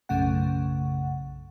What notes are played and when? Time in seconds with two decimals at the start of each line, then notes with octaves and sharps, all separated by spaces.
0.09 B1 F#2 C#3 A3 F#5